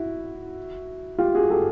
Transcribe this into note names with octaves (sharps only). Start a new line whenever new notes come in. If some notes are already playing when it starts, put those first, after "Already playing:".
Already playing: E4 F#4
F4 G4
F#4 G#4
G4 A4